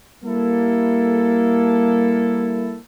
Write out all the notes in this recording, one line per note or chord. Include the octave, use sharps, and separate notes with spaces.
G3 A#3 E4 A4